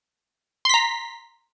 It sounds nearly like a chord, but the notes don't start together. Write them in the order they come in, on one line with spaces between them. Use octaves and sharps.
C6 B6 A#5